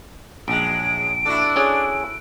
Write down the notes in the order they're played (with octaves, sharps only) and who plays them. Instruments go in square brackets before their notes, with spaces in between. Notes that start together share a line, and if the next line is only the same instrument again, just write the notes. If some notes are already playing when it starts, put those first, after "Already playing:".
[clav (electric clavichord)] A#1 [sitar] F#2 G#3 [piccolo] D7
[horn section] D4 [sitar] E4 F#4 A4
[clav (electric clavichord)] C#4 G#4